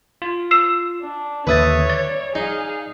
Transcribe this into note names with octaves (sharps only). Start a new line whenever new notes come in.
F4
E6 C7 E7
D4
D#2 D3 B4 C#5 E5 A5 D#6
D5 A6
D#4 G#4 F5